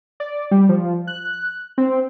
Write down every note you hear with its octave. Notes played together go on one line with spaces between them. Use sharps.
D5
G3
F3
F#6
C4